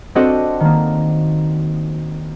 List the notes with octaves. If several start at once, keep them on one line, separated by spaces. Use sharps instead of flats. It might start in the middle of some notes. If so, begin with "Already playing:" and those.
C4 D4 F#4 A4 D#5 F#5
D#3 A#3